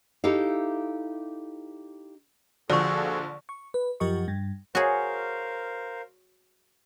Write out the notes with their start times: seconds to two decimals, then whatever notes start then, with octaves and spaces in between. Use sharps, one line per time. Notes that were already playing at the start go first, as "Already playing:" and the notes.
0.24 D#4 E4 G4 A4 F5
2.70 A#1 D3 F3 F#4 G#4 A4 D5 C#6
3.49 C#6
3.74 B4
4.00 F#2 F3 G4 A#4 D#5 C#6
4.28 G2
4.75 F#4 G#4 A#4 C5 C#5 F5